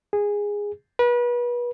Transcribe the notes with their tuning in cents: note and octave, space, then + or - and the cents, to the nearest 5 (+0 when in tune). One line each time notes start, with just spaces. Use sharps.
G#4 -15
B4 -35